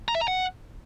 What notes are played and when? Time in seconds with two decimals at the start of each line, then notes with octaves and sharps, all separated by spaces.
0.08 A#5
0.15 E5
0.21 A#5
0.28 F#5